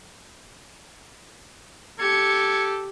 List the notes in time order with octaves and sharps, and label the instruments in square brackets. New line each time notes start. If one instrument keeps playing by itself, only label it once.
[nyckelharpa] G4 [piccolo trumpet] A4 [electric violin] G#6 C#7